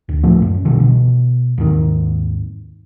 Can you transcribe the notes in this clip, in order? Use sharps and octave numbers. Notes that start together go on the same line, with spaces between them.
D2
D2 A2 F3 A3
F#2
C2 B2 D3 E3
B2
D#2 G#2 D#3